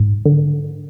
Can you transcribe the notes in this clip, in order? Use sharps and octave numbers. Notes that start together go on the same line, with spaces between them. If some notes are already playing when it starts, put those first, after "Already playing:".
Already playing: G#2
D3